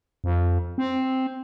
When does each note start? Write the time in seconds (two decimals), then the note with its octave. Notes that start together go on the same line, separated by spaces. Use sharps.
0.24 F2
0.78 C4